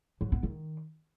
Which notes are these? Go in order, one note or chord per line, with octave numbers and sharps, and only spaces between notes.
F#3
B3
D#3